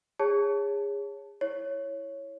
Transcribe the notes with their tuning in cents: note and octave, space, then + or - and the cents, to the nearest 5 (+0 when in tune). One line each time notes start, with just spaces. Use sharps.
G#4 -30 C#5 +0 A5 +0
E4 +0 C#5 +0